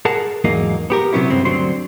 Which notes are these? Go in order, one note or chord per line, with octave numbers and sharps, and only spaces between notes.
G#4 A#4 F#5 A5
E2 G#2 F#3 A#3 D#4
B3 G4 A#4
C3 F#3 B3 C#4 E4
G2 C#3 B3 C4
D2 D3 F#3 C4 C6